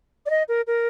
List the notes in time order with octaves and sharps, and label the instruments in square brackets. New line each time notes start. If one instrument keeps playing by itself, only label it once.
[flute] D5
D#5
A#4
A#4